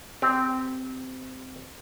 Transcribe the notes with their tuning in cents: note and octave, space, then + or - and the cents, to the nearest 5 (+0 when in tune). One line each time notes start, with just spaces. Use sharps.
C4 -15 G4 +0